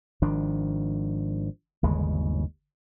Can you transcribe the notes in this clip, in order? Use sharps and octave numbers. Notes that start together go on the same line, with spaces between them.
G#1 D#3 F3 D4
G1 D#2 C#3 G#3